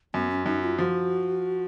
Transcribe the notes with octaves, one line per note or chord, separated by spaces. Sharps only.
F#2 B3
C#4
F#2 D#4
F4
F3 F#4